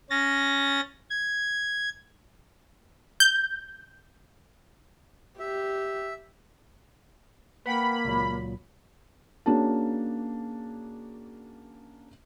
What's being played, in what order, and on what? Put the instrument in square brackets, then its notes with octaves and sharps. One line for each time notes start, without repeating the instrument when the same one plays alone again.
[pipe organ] C#4 A6 A#6
G#6
[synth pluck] G6
[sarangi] G4 [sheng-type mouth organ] E5
[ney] A#3 [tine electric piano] B4 F#5 G5 [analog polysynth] B5
[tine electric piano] C#2 A#2 F#3
[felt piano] A#3 C#4 D4 F#4 G#4 A5